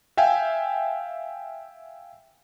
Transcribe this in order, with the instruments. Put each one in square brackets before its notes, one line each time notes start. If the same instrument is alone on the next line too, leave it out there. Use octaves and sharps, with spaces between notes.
[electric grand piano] E5 F5 G5 G#5